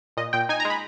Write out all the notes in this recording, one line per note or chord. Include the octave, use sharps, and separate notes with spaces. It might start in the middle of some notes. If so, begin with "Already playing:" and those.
A#2 D#5
A#2 G5
D#4 G#5
A#5
G#3
B5